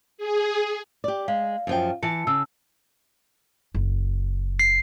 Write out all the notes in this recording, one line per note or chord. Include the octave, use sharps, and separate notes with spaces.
G#4
G4 D5
G#3 F5
F#2 F3 G5
E3 A5 C#7
C#3 E6
F#1
C7